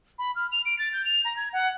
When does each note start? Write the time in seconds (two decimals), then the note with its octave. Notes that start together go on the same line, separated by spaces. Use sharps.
0.19 B5
0.36 F6
0.52 F7
0.66 D7
0.79 A6
0.93 G6
1.05 F7
1.25 A#5
1.37 G#6
1.53 F#5